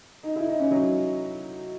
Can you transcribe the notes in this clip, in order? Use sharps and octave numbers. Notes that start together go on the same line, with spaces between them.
D#4
E4
D#4
C#4
F#3